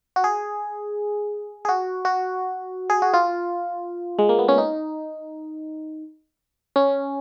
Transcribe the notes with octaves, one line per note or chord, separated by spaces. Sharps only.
F#4
G#4
G#4
F#4
F#4
G#4
F#4
F4
G#3
A#3
B3
C#4
D#4
C#4